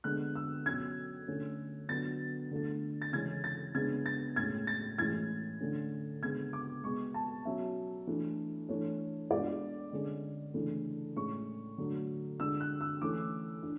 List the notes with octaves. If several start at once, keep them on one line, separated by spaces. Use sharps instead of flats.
D3 G#3 B3 D4 F#6
E6
B2 F#3 C#4 G#6
D3 A3 C#4
D3 F#3 B3 D4 A6
D3 A3 D4
A6
C#3 E3 G#3 C#4 G#6
A6
C#3 G#3 B3 D4 G#6
A6
A2 G#3 C#4 G#6
A6
A2 E3 G#3 C#4 G#6
D3 A3 C#4
C#3 G#3 B3 D4 G#6
D6
B2 G#3 B3 C#6
A5
B2 F#3 C#4 E5
E3 A3 D4
E3 A3 D4 C#5
B2 G#3 D4 D5
D3 G#3 C#4
C#3 E3 A3 D4
A2 G#3 C#4 C#6
D3 F#3 A3
D3 G#3 D4 E6
F#6
E6
E3 A3 C#4 D6
D4